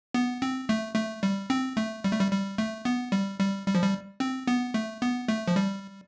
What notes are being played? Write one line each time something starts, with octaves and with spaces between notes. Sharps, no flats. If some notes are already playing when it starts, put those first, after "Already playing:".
B3
C4
A3
A3
G3
C4
A3
G3
A3
G3
G3
A3
B3
G3
G3
G3
F3
G3
C4
B3
A3
B3
A3
F3
G3